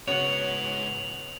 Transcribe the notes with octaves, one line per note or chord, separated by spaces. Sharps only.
G#2 C#3 B3 F#4 C#5 F#5 F7 F#7